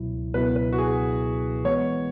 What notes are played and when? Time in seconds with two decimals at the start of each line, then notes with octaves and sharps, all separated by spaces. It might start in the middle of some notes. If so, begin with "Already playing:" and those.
Already playing: C#2 B2 F#3 E4
0.34 C#2 B2 F#3 B3 E4 B4
0.56 B4
0.73 F#4
0.78 G#4
1.64 E3 G#3 B3 C#5